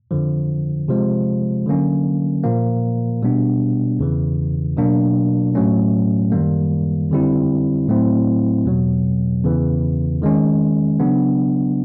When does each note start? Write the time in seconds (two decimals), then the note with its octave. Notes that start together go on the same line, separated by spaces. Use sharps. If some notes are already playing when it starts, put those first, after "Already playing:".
0.11 F2 D3 F3
0.88 C3 F3 G#3
1.66 D3 F#3 A#3 C#4
2.43 A#2 F3 A#3
3.22 B2 G3 B3 D4
3.99 E2 C#3 E3
4.77 B2 F#3 A#3 D4
5.55 A2 F#3 A3 C#4
6.32 F#2 D#3 G3 A#3
7.10 F2 D3 G3 C4 E4
7.88 A2 F#3 A3 C4 E4
8.65 E2 B2 F#3
9.44 E2 C#3 E3
10.22 D#3 G#3 C#4
11.00 C#3 F#3 B3 D4